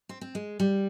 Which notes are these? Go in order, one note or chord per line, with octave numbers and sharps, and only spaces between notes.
C4
C4
G#3
G3